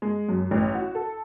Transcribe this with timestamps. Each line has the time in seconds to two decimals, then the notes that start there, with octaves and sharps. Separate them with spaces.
0.02 G#3
0.29 F#2
0.51 A1
0.75 F#4
0.95 A4